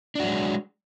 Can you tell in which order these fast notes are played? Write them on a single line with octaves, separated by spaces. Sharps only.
D4 F#4 F#3 G#3